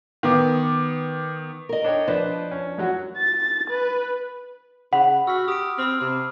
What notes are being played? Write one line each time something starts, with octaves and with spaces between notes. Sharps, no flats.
D#3 B3 D6
A#4 D#5
D4 C#5 G5
F3 D4 B4 C5 D#5
C#4
F#2 F#3 F#4
A6
B4
C#3 F#5 B5
F#4 E6 F6 B6
G4 D#6 D7
C4 B5 E6 F6
C3